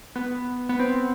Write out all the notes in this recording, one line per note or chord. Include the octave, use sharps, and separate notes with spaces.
B3
B3
C4